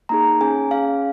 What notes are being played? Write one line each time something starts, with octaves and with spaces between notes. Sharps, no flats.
A#3 D#4 G#4 A#5
C#4 G#4 G#5
C#4 G#4 F5